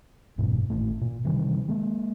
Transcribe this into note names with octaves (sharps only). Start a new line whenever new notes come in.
F#1 E2 G#2 B2
G#1 A2 A3
A#2
C3 D#3 E3 G3
G#3 A#3